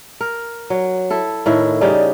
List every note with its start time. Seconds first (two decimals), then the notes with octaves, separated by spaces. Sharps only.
0.21 A#4
0.70 F#3
1.10 E4 A4
1.46 A2 D#3 E4
1.81 C#3 G3 D#4